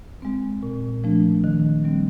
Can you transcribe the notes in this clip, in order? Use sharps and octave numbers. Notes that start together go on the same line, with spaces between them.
G#3 C4
A#2
F3 A3 D4
D#3
G3 C4